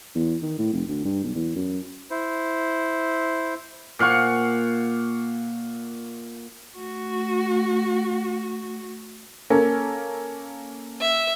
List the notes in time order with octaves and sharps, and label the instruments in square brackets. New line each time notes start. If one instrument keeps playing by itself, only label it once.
[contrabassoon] E2
D#3
A2
F1
D2
G2
B1
E2
F#2
[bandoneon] E4 C5
[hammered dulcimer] A#2 F5 F#5 C#6
[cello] A3 F#4
[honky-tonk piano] A#3 C#4 A4
[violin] E5